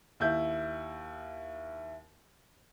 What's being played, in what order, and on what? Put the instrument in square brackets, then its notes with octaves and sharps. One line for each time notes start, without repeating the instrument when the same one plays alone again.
[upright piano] D#2 E4 G6